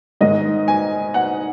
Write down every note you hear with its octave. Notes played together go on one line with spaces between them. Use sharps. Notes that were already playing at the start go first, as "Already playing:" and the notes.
G#2 D#3 G#3 D#5
G#5
F#5